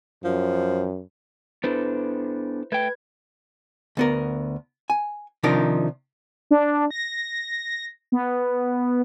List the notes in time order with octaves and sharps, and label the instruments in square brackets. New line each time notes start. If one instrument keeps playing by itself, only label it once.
[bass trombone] F#2 [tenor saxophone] F3
[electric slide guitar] B3 D4 A4 [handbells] E4 B4 C5
[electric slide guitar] A3 G5 [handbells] B4 G#6
[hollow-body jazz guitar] D2 B3 A#4
G#5
C3 D#3 F3 D4 D#4 A#4
[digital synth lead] D4
A#6
B3